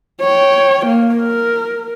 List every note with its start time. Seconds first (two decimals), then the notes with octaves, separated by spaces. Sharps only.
0.21 C#5 G5
0.86 A#3
1.15 A#4